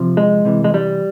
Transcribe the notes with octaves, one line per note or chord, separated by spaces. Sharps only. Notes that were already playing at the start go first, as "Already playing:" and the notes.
Already playing: C3 F3
G#3
C3 E3
G#3
G3